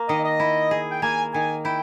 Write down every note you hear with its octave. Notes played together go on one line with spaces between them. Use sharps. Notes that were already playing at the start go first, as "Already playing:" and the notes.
Already playing: A#3
D#3 D#5
D#5
E4
G#4
G5
A#3 G#5
D#3 G#5
E4 G5